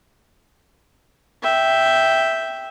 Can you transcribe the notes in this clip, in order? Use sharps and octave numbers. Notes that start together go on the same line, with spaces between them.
E5 G5